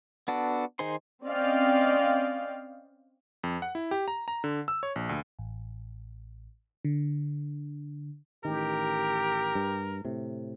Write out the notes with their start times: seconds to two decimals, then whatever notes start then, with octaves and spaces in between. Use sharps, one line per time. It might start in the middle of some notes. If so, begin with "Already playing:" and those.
0.28 B3 D4 F#4 A4
0.79 D#3 D#4 G#4 C5 C6
1.25 C4 C#4 D5 D#5 F5 G5
3.44 F2
3.62 F#5
3.75 E4
3.91 G4
4.08 A#5
4.28 A#5
4.44 D3
4.68 E6
4.83 C#5
4.96 A#1
5.09 D2
5.39 A1
6.85 D3
8.45 A1 D#3 G4 A#4
9.55 G2
10.05 A2 C3